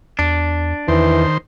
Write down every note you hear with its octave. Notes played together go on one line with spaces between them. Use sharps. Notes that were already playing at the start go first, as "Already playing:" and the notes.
E2 D4
E2 D#3 E3 C5